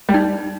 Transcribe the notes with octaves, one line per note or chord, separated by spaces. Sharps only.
G3
D#4